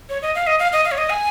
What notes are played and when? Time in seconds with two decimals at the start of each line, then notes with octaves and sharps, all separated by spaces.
0.09 C#5
0.22 D#5
0.35 F5
0.47 D#5
0.59 F5
0.73 D#5
0.85 F5
0.91 C#5
0.98 D#5
1.10 G#5